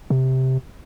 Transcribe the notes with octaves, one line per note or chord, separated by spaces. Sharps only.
C3